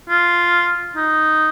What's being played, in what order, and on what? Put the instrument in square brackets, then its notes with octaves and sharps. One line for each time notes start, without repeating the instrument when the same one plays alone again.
[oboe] F4
D#4